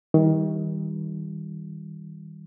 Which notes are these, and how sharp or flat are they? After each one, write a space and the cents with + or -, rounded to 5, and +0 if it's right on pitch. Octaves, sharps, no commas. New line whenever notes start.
D#3 +30 G3 +0